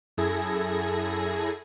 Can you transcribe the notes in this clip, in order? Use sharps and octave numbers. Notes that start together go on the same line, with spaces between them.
F#2 E4 G#4 A4 G#6 A#6